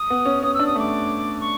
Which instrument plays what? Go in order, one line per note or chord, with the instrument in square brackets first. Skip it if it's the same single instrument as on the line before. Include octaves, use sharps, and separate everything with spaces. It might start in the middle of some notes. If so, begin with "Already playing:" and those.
Already playing: [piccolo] D#6
[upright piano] B3
C#4
[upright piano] C#4 [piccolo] D#6
[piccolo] E6
[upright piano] D4
[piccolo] D#6
[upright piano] A3 [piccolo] D6
[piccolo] C#6